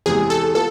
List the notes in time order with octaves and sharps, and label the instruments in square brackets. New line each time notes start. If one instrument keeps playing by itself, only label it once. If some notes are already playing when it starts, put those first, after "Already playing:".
[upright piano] E2 C3 G#3 [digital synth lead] G#4
[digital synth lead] A4
[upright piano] B3 F4 [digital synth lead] A4